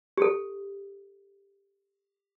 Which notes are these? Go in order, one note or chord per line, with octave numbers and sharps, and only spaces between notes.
G4 A4